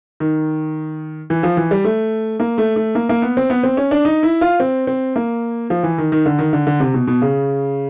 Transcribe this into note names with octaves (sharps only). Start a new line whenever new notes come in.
D#3
E3
F3
E3
G3
A3
A#3
A3
A3
A#3
A#3
B3
C4
B3
C4
C#4
D4
D#4
E4
F4
C4
C4
A#3
F3
E3
D#3
D#3
D3
D#3
D3
D3
C3
B2
B2
C#3